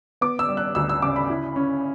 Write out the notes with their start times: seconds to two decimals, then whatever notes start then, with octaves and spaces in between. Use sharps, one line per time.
0.21 B3 D6
0.39 E6
0.49 G3
0.57 F#6
0.75 D2 E6
0.90 E6
1.02 C#3 D6
1.16 B5
1.30 E4
1.56 C#4